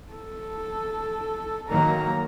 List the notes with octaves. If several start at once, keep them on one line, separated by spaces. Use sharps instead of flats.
A4
D#3 F#3 A#3 A#5